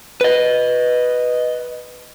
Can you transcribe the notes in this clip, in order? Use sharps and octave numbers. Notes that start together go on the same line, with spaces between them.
B4 D#5